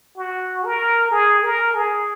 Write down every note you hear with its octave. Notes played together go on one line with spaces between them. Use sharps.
F#4
A#4
G#4
A#4
G#4